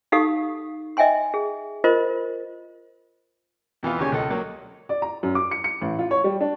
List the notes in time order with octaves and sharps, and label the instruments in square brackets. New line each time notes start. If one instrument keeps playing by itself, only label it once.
[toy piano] D#4 G4 A4 F5 C#6 D#6
D#5 E5 G5 G#5 C6
G#4
F4 A#4 C5 D#5
[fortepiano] F2 E3 B3 F4
D#2 C#3 G4 C#5 G#5
C#2 A4 D#5
F#3 A#3
[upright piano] D5
A#5
F#2
D6
C#7
C#7
A1
F4
C#5
G3
D4